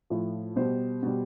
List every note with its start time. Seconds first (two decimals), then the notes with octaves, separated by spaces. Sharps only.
0.10 A2 F3
0.56 B2 G3 C5
1.03 B2 G3